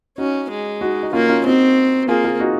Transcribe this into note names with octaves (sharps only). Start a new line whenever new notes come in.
C#4 D#4 F#4
G#3
D#4 F#4
D#4
A#3 C#4 F4
C#4 F4
C4 D#4 F#4
A#3 F4 G#4
F4 G#4
D#4 F#4